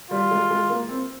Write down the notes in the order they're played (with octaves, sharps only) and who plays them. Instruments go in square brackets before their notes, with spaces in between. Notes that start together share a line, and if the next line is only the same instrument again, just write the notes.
[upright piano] G3 [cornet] F4
[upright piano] G#3
G#3
A#3
C4